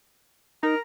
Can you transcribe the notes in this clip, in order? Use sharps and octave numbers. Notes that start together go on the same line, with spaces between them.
D#4 A#4 A#5